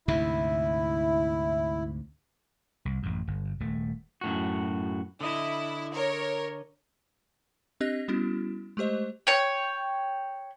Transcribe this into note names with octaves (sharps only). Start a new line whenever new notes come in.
D2 G#2 C3 E4
C2
A1 F#2
G1
D#1 A3
F#2 A2 F#4
D3 E4 D#5
A#4 C#5
C4 D4 G4 D#5 F#6 A#6
G3 B3 C#4 E4 F#4
G#3 A3 G4 C5 D#5
C#5 G5